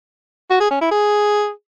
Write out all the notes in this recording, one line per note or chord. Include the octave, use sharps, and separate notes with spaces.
F#4
G#4
C#4
E4
G#4